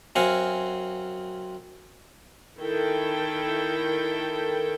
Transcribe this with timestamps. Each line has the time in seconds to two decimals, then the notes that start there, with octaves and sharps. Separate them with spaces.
0.16 F#2 C4 F5 F#5 G#5
2.59 D#3 E4 A4 G5